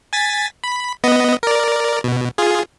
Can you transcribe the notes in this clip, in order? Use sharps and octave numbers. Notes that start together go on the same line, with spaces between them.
G#5 A6 B6
B5
B3 D#5
A#4 D5
B2
F4 G#4